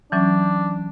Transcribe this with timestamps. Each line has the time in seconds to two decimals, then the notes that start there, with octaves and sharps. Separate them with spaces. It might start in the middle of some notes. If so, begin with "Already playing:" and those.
0.12 E3 F#3 C#4 D4